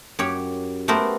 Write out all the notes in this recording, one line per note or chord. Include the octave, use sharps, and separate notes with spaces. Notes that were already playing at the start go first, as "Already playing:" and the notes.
F#2 G4 C#5
A3 B3 G4 A#4 C5